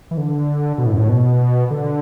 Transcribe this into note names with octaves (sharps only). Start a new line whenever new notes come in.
E3
D3
B2
A2
F#2
A2
B2
D3